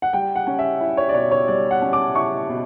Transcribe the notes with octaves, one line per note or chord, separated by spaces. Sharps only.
F#5
G3 G5
F#5
C#4
E5
E4
C#5
D5
B2 C#5
C#5
G3 D5
F#5
C#4
D6
E4 C#6
B2